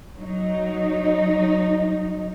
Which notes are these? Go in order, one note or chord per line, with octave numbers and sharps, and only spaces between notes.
F#3 D#4